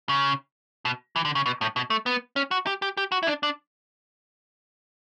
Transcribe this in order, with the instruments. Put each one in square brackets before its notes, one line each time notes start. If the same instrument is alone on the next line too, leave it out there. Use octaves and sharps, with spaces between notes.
[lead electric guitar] C#3
B2
E3
D3
C#3
B2
A2
B2
A3
B3
C#4
F#4
G4
G4
G4
F#4
E4
D4
D4